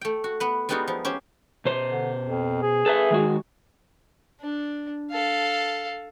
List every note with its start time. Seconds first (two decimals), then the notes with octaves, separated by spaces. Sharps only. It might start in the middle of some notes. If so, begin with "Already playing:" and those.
0.01 A3 G5
0.24 F#4
0.40 B3 B4
0.69 G3 G#3 B3 D#4 F4 F#4
0.88 F3
1.05 C#4 G4 C5
1.65 B2 C5
1.90 D3
2.26 F2
2.62 G#4
2.86 A4 B4 E5
3.11 D#3 G#3 F#4
4.41 D4
5.11 A4 F5